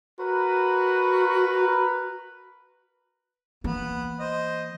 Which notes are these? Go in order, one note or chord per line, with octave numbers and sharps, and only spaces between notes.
F#4 A#4 B4
E3 A#3 B3
C5 D#5